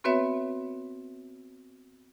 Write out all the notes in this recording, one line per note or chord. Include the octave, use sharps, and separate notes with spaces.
B3 C4 F#4 B4 C#5 E5